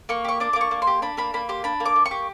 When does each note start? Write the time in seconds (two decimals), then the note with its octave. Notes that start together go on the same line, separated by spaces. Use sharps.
0.09 A#3 C#6
0.25 G4 C#6
0.40 D4 D6
0.53 D6
0.56 A#3 C#6
0.71 A#3
0.82 C6
0.87 G4
1.02 D4 B5
1.17 A#3 B5
1.34 A#3 B5
1.49 G4 C6
1.64 D4 B5
1.80 A#3
1.86 D6
1.96 A#3
2.05 C#6
2.11 G4